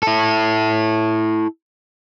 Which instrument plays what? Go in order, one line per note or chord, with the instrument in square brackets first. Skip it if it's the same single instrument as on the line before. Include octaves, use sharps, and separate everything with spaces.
[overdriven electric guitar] E4 A4